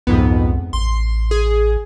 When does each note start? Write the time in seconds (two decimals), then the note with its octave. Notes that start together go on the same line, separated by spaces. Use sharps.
0.07 C2 F2 G#2 B3
0.73 A1 C6
1.31 G#4